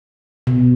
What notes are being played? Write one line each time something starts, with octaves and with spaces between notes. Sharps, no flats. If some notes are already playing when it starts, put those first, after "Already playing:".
B2